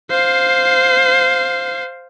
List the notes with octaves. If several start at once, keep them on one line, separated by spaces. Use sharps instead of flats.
C5 F5